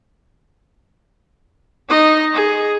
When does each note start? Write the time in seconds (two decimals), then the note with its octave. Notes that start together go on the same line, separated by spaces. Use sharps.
1.89 D#4 D#5
2.33 G#4